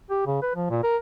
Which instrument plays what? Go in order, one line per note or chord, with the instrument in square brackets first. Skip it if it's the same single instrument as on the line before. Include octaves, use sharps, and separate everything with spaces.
[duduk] G4
C#3
B4
F3
A#2
A#4